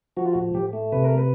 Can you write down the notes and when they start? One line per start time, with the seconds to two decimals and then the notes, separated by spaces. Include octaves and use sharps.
0.17 F3 F#4
0.26 F4
0.33 A2 F#4
0.54 A2 G4
0.73 A3
0.92 C3 B4
1.04 A#4
1.18 B4